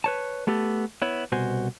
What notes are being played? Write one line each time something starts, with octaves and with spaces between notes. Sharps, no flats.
B4 C#5 A5
A3 B3 G4 A4
B3 E4 C#5
C2 B2 F#4 C5 G#5